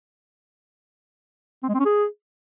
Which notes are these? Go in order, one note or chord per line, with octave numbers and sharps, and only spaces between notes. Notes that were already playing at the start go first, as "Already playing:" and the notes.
C4
G#3
C4
C#4
G#4